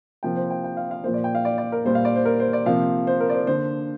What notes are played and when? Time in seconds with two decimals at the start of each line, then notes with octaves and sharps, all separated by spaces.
0.23 C3 F3 A#3 G5
0.36 C5
0.50 G5
0.64 G5
0.77 F5
0.91 F5
1.04 A#2 F3 A#3 C5
1.14 D5
1.24 G5
1.35 F5
1.45 D5
1.58 D5
1.72 A#4
1.85 A#2 G3 A#3 C5
1.95 F5
2.05 D5
2.16 C5
2.25 A#4
2.40 C5
2.53 D5
2.66 C3 F3 A#3 F5
3.07 C5
3.20 A#4
3.30 D5
3.34 C5
3.47 D3 A#3 C5